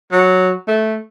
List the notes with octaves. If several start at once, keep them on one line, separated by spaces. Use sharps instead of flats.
F#3
A3